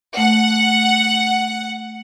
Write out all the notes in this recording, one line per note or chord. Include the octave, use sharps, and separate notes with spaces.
A3 F#5